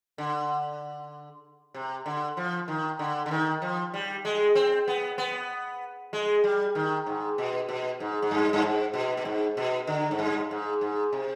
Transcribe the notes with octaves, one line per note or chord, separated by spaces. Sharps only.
D3
C3
D3
F3
D#3
D3
D3
D#3
F3
G3
G#3
C4
B3
B3
G#3
G3
D#3
G#2
B2
B2
G#2
G#2
G2
G2
G#2
B2
B2
G#2
B2
D3
G#2
G2
G#2
G#2
C3